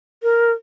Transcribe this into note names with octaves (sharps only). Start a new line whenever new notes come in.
A#4